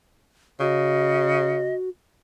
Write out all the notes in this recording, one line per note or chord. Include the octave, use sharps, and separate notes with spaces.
C#3 F#4 D#5